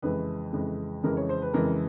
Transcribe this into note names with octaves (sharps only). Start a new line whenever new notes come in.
F2 C#3 E3 G#3 B4
F2 C#3 E3 G#3
F2 C#3 E3 G#3 A#4
C#5
C5
B4
F2 C#3 E3 G#3 A#4